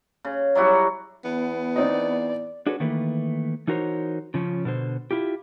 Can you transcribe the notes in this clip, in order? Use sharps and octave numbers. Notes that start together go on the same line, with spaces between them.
C#3
F#3 G3 E4 F#4
E2 B3
C4 D#4 D5 D#5
D4 F#4 G#4 A4 B4 C#5
D#3 E3 A3 A#3 B4
E3 D#4 F#4 A#4 C5 C#5
C#3 F3 C#4
B2 D3 C5
E4 F4 G4